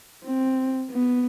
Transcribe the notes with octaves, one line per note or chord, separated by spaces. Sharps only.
C4
B3